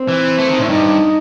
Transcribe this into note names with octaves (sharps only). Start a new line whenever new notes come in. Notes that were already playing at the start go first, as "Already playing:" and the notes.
Already playing: C4
E3
A3
D#3
A2
E4
G2 D#4